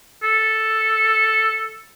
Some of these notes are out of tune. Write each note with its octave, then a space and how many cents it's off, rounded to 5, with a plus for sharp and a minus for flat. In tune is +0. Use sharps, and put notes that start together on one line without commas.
A4 +0